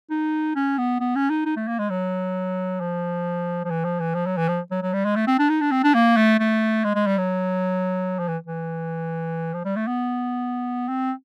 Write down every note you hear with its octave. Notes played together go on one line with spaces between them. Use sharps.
D#4
C#4
B3
B3
C#4
D#4
D#4
A3
A#3
G#3
F#3
F3
F3
E3
F3
E3
F3
F#3
E3
F3
F#3
F#3
G3
G#3
A3
C4
D4
D#4
D4
C4
D4
A#3
A3
A3
G#3
G#3
G3
F#3
F3
E3
E3
F3
G3
A3
B3
C4